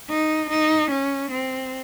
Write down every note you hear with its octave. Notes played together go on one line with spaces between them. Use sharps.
D#4
D#4
C#4
C4